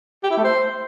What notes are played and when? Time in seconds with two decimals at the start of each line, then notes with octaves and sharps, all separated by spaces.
0.23 G4
0.30 E4
0.37 A3
0.44 C5